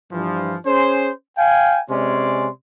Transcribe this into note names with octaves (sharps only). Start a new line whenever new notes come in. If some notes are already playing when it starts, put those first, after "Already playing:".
G2 E3 F3
C#4 G#4 C5
F5 G5 G#5
C3 G#3 C#4 D5 C6